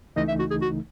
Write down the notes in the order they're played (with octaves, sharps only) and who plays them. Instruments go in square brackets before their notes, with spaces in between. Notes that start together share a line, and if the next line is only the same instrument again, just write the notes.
[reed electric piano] C#2 C#3 E3 A3 D#4 [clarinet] D#5
[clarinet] E5
F#4
G#4
F#4